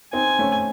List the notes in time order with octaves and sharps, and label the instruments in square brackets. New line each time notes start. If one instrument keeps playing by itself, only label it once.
[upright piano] C4 D#4 [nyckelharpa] G#5
[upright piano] A3 C#4